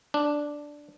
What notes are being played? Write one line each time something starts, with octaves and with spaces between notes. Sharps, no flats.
D4